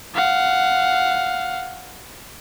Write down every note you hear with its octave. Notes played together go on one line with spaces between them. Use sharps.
F5 F#5